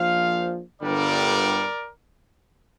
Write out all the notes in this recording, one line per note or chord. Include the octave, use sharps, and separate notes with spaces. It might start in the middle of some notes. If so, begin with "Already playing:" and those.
Already playing: A#1 A#2 F3 C5 F5
G1 G2 D3 G3 A#4 D5